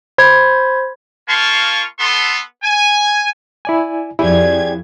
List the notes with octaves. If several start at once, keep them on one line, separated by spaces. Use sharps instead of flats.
C5 B5 G#6
A#3 F4 F5 A5 C6 C#6
B3 A4 C6
G#5
E4 D5 G#5
F2 E4 G4 G#4 D5 G#6